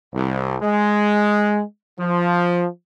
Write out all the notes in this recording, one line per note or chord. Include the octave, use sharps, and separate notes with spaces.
C2
G#3
F3